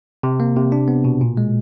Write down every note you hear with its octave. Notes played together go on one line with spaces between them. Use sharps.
C3
A#3
C3
D4
B3
B2
A#2
G#3